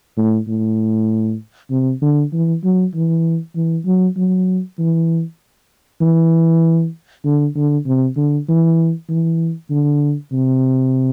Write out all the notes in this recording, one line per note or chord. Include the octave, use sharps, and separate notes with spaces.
A2
A2
C3
D3
E3
F#3
E3
E3
F#3
F#3
E3
E3
D3
D3
C3
D3
E3
E3
D3
C3